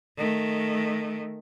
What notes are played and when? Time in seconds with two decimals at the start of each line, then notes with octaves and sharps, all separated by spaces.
0.17 D#3 A3